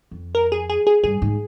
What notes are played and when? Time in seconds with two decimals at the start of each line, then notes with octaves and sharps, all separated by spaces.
0.11 F2
0.35 A#4
0.52 G#4
0.70 G#4
0.87 G#4
1.03 G2 G#4
1.22 G#2